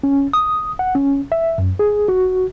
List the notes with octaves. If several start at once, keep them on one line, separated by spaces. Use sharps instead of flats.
C#4
D#6
F#5
C#4
E5
F#2
G#4
F#4